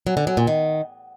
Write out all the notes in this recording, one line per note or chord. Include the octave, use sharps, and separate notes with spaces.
F#3
D3
F#3
A#2
D#3